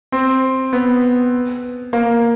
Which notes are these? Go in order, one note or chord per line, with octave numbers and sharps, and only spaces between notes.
C4
B3
A#3